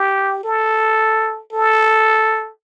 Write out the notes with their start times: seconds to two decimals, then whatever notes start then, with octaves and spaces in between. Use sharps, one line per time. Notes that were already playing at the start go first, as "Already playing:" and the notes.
Already playing: G4
0.44 A4
1.53 A4